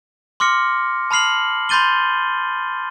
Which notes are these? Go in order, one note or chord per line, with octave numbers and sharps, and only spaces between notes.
C6 D6 F6 A#6 C#7
A5 B5 F6 C7 F#7
B5 C6 G6 A6 D#7 G7